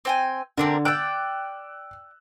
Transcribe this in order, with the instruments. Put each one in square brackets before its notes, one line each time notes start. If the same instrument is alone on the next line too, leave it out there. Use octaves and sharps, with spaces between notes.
[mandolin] C4 G5 G#5
[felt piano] D3 [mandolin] C4 D4 A#4
[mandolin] D5 G5 [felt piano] E6 F#6